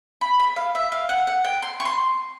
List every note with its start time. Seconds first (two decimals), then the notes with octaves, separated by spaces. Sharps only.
0.21 B5
0.40 B5
0.56 F5
0.75 E5
0.92 F5
1.09 F#5
1.27 F#5
1.45 G5
1.62 C6
1.80 C#6
1.85 C6